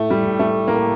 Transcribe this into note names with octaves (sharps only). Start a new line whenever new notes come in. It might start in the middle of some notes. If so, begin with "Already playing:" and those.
Already playing: A2 A3
G3
A2
A3
A2 A#3